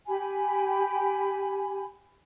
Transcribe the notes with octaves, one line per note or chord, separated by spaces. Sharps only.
G4 G#5 B5